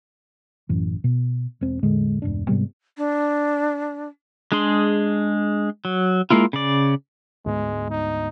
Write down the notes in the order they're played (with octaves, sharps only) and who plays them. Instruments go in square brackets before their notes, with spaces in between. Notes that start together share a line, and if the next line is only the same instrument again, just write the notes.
[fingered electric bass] A1 F#2 E3
B2
E1 C4
E2 A2 D3 G#3
E1 G2 D4
G#2 C3 G3 B3
[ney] D4
[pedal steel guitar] G#3 D4 G#4 C6
F#3
G#3 A#3 E4 F4
C#3 D5
[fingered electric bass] D2 G#2 B3 [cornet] G#3
[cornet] D#4